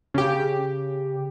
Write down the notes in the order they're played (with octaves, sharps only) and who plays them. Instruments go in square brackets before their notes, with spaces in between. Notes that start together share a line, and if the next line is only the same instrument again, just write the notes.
[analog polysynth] C#3 G4